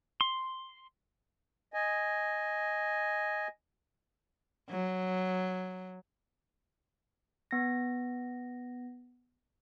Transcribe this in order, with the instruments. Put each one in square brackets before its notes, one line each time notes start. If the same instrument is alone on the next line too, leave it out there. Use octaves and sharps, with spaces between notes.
[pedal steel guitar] C6
[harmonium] D#5 G#5
[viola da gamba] F#3
[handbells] B3 A#6